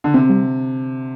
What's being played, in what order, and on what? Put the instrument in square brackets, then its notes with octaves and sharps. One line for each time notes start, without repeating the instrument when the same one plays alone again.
[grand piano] D3
[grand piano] C3 [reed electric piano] C4
[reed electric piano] G3